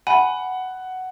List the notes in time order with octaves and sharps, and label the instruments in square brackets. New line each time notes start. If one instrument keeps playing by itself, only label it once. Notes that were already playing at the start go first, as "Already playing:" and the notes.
[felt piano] F#5 [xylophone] G#5 B5